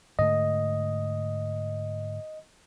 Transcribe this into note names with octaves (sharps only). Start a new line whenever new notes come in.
G#2 D3 A3 D#5